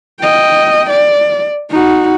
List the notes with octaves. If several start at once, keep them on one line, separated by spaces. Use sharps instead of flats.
D#5 G5
D5
D#4 F#4